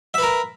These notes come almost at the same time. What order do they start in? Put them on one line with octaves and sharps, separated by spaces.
E5 B4 A#4